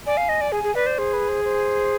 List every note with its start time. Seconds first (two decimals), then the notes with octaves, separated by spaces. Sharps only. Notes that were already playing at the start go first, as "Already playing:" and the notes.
0.06 D5 G#5
0.17 F5
0.29 D#5
0.41 D5
0.52 G#4 G#5
0.64 G#4
0.75 B4 D5
0.86 C5
0.98 G#4 C5
1.13 B4
1.29 C5
1.44 C5